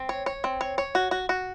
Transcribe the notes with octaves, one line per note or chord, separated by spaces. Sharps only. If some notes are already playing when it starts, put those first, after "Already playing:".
Already playing: C4
C#5
C#5
C4
C#5
C#5
F#4
F#4
F#4